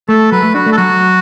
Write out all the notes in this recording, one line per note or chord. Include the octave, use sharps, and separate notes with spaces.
A3 A4
F#3 B4
A3
D4 F#4
A3
A4
F#3 F#4